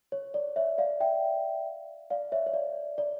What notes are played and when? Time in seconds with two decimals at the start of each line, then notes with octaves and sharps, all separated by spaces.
0.12 C#5
0.34 D5
0.56 C#5 E5
0.78 D5 F5
1.00 E5 G5
2.10 D5 F5
2.32 C#5 E5
2.46 C#5
2.54 D5
2.98 D5